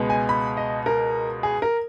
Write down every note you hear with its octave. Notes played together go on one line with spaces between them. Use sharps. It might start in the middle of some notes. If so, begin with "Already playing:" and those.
Already playing: C#2 B2 G#3 B3
G#5
B5
D#5
A#4
G#4
A#4